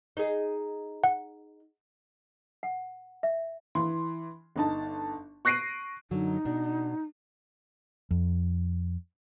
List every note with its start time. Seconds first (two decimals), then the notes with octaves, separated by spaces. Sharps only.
0.17 D#4 G#4
1.04 F#5
2.63 F#5
3.23 E5
3.75 E3 C6
4.56 G1 D#4 A5
5.45 C#6 F#6 A#6 C7 D7 D#7
6.11 F#2 D3 F#3 D#4
6.45 B2 D4
8.11 F2